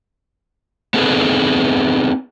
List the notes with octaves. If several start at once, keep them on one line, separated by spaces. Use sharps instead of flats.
B3 C4 D#4 G#4 A4 B4